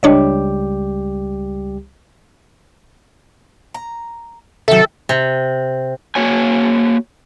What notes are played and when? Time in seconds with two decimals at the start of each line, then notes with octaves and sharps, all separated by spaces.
0.03 C#2 G3 D4 G4 C#5 D#5
3.74 A#5
4.68 C3 D#3 F#3 A4 E5 G5
5.09 C3
6.15 A#3 F#4 C#5 G#5